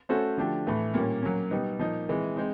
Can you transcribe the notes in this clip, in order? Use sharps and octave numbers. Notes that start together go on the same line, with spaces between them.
A3 C#4 F#4 A4 C5
D3 F3 A3 D4 G4
A2 E3 A3
A#2 G3 A#3 C#4
F#3 A#3 C#4
B2 G3 B3 D#4
A#2 F3 A#3 D#4
C3 E3 G#3
G#3 C4 D#4